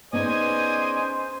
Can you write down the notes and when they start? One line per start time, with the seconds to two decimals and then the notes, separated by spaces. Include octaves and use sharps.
0.13 B3 C#4 D#4 G#4 C5 D5 D#5 G#5